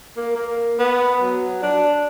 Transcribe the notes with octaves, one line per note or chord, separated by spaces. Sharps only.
A#3
A#3
B3
F#3
D4